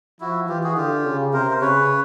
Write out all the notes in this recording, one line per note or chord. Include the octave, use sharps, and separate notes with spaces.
F3 E4 F#4
E3 F4 G4
F#4 G#4
D3 F4 G4
C#3
C3 A#4 C5
C5
C#3 B4 C#5